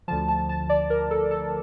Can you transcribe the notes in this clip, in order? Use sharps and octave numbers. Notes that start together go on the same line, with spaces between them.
D2 D3 F3 A5
A5
A5
D5
A#4
A4
A4